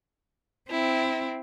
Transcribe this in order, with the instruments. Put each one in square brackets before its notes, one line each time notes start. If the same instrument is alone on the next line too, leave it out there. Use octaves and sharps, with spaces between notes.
[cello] C4 [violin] E4